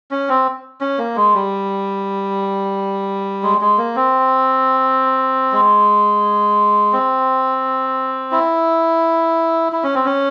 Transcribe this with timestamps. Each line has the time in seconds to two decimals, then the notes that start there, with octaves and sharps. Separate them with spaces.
0.11 C#4
0.29 C4
0.81 C#4
0.98 A#3
1.16 G#3
1.34 G3
3.43 G#3
3.61 G#3
3.78 A#3
3.96 C4
5.52 G#3
6.93 C4
8.32 E4
9.72 E4
9.84 C#4
9.95 C4
10.05 C#4